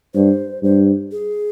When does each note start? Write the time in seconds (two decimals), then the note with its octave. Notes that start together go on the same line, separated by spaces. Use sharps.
0.14 G2 C5
0.63 G2 C5
1.12 G#4